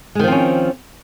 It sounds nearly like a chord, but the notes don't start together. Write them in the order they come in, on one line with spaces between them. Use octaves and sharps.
G#3 D#3 F3 C4 C#4